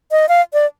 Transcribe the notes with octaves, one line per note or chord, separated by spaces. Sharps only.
D#5
F5
D5